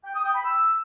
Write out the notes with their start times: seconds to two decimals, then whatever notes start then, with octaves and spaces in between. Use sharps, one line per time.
0.04 G5
0.14 D#6
0.25 G5
0.35 B5
0.45 E6